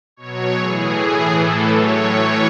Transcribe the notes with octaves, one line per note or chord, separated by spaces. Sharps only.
B2 F#3 C#5
A2 E3 G#4
A2 E3 G#4
A2 E3 A4
A2 F#3 C#5
A2 E3 C#5